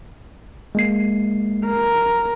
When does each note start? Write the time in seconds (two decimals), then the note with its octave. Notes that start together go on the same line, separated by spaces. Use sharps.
0.75 G#3 A#3 C7
1.66 A#4